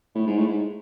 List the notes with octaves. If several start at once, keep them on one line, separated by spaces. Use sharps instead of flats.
A2
G#2
A2
G#2